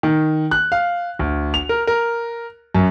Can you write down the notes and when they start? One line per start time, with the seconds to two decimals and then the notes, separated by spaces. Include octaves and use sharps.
0.03 D#3
0.51 F#6
0.72 F5
1.19 D2
1.54 F7
1.69 A#4
1.87 A#4
2.75 F#2